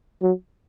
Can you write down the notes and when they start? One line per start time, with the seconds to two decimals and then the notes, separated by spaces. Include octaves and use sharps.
0.22 F#3